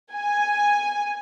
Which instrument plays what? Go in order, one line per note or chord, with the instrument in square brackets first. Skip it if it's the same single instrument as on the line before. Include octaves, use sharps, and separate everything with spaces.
[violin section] G#5